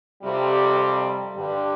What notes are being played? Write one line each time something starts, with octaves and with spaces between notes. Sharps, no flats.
F2 C3 G3
G2 D3 G3